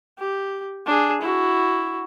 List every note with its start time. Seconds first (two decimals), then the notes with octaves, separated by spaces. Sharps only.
0.19 G4
0.86 D4 G#4
1.22 E4 F#4